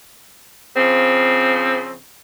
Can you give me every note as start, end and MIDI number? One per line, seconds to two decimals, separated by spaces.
0.76 1.97 49
0.76 1.97 53
0.76 1.97 60